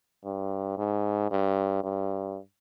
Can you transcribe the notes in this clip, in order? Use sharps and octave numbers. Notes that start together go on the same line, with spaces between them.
G2
G#2
G2
G2